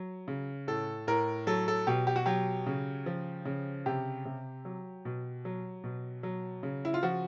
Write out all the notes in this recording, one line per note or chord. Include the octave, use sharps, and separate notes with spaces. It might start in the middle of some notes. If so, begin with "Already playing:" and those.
Already playing: F#3
C#3
A2 A4
A2 A#4
F#3 A4
A4
B2 G4
G4
F#4
F#3 G4
C#3
F3
C#3
C3 G4
C3
F#3
B2
F#3
B2
F#3
C#3
E4
F4
F3 F#4